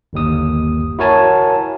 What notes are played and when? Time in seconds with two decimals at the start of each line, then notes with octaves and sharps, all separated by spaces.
0.13 G1 D#2 D#6
0.99 E4 F#4 A#4 C#5 G#5 A5